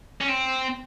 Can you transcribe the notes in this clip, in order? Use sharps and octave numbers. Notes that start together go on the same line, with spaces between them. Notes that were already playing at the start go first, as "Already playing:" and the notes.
C#4
C4